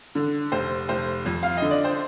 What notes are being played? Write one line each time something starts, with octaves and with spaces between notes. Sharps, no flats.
D3
F1 C5
F1 C5
F2
F5
D3 D#5
D5
C5